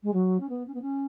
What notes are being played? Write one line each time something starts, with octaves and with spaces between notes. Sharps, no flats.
G#3
F#3
C#4
B3
C#4
B3
C#4